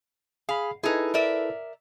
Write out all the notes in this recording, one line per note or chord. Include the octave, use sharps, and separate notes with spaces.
G#4 F5 B5
D#4 E4 G#4 A4 B4
A#4 D5 E5